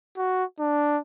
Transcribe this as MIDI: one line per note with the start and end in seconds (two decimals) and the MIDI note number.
0.17 0.44 66
0.59 0.98 62